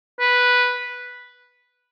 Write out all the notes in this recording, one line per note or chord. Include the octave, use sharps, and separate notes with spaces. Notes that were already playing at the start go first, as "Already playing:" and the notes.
B4